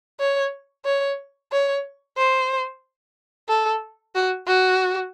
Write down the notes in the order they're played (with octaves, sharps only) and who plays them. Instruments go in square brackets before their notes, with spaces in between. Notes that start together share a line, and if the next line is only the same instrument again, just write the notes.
[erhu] C#5
C#5
C#5
C5
A4
F#4
F#4